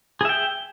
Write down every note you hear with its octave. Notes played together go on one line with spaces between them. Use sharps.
G#4 E5 G5